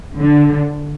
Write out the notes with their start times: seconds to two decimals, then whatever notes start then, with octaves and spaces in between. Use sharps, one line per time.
0.17 D3